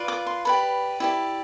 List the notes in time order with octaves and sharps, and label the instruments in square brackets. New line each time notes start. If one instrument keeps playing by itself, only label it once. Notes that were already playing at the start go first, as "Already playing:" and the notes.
Already playing: [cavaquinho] F4 B4 D5
D6
C6
G4 B4 D5 B5
E4 G4 D5